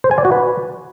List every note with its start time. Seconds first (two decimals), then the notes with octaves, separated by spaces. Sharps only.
0.04 C5
0.11 G#5
0.18 D5
0.25 F#4
0.32 B4